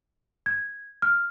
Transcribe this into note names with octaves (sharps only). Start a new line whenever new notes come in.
G#6
F6